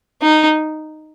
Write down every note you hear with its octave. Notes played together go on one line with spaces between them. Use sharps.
D#4